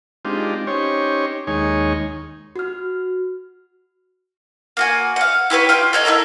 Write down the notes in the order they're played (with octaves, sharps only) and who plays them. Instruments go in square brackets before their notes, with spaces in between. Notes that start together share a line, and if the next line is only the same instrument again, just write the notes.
[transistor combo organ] G#3 C4 D4 D#4 F4 G4
C#4 D#4 G4 C5 C#5
D#2 G#3 D#4 C#5 G#5
[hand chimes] F#4 F6
[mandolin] A#3 F#4 G#5
F5 F#5
E4 G4 B4 C#5
F4 G4 G5
A4 C#5 D#5
E4 F4 A4 A#4